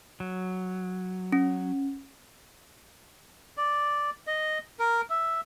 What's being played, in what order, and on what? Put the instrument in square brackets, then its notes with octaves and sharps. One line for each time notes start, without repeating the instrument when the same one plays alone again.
[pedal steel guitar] F#3
[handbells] C#4
[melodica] D5
D#5
A#4
E5